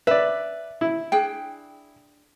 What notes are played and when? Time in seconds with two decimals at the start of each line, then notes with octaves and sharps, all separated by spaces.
0.07 B4 D5 E5
0.81 E4
1.12 D4 G#4 G5